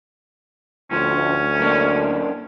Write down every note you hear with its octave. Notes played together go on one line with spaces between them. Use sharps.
D2 A2 F3 C#4
F#2 A#3 D4